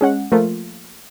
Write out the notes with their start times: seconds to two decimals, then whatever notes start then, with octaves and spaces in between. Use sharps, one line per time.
0.01 G#3 C#4 F#5
0.32 F3 A3 A#3 F4